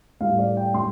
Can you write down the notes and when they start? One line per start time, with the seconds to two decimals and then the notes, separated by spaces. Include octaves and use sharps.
0.20 A2 G3 F5
0.39 D5
0.57 G5
0.74 A2 G3 C6